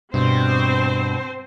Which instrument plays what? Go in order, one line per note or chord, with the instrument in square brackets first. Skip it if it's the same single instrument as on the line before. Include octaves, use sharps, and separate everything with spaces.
[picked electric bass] G2 [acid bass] B2 [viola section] C4 C5